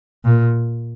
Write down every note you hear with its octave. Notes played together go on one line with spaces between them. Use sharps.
A#2